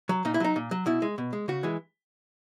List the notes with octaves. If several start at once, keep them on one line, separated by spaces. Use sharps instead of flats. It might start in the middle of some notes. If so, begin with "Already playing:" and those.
F#3
A#2 D#4
E4
F#3 D#4
A#2
F#3
B2 E4
G#3
B2
G#3
C#3 F#4
E3 G#3